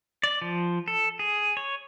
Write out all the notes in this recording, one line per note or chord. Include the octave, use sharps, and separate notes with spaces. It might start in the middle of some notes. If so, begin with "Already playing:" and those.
D5
F3
A4
G#4
C#5